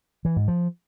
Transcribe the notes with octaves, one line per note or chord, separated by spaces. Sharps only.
E3
G#2
F3